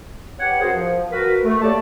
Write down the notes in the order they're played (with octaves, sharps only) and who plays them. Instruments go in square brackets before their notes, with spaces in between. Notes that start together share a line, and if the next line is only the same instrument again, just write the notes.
[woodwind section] G4 B4 C#5 F#5
F#2 F#4 G#4 A#4 C5
F3
F#4 A#4 B4
A3
A3 A#3 G4 C#5 D5 A5